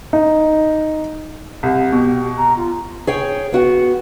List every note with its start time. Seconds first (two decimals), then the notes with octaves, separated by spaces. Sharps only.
0.13 D#4
1.63 C2
1.92 B2 G4
2.37 A#5
2.57 F4
3.07 G#4 C#5 G5
3.52 B3 F#4 F#5